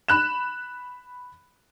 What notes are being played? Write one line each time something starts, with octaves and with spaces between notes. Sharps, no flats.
B5 F#6 E7